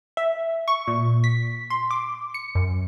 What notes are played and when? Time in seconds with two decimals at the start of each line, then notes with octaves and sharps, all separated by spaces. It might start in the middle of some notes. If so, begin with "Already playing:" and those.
0.17 E5
0.68 C#6
0.87 A#2
1.24 B6
1.70 C6
1.91 D6
2.34 C#7
2.55 F#2